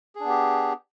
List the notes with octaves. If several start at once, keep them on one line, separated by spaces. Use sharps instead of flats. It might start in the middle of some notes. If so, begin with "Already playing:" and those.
B3 D4 G4 G#4